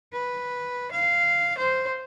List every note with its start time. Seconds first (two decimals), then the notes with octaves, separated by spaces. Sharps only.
0.13 B4
0.91 F5
1.58 C5